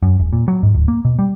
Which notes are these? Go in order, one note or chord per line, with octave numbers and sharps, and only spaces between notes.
F#2
E1
A#2
F#3
G#2
D1
A#3
B2
G3